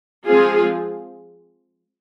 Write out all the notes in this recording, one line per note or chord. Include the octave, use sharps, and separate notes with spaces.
F3 G#3 C4 F4 G#4